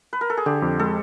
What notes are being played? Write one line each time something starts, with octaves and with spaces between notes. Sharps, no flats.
B4
A#4
A4
G#4
D3 G4
F2
G#3 A4